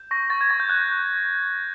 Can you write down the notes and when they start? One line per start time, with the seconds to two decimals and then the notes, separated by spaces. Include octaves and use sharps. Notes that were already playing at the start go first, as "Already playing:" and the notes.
Already playing: G6
0.11 C#6 A#6
0.30 C#6 A6
0.41 G#6
0.50 C#6 A6
0.60 G6
0.69 F#6 G#6